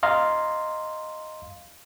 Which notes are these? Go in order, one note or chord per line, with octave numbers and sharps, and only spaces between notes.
D#5 F5 A#5 C6